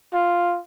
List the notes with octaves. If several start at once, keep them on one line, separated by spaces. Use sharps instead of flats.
F4